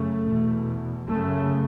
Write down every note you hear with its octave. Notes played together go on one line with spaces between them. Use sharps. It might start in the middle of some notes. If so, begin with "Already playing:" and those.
Already playing: F#2 C#3 A3
E2 B2
F#2 C#3 A3